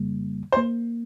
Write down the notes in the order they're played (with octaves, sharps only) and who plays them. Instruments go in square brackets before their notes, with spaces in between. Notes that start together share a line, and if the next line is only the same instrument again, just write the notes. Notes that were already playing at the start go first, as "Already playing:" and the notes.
Already playing: [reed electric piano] F2 C#3 G3 A#3
[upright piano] C5
[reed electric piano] A#3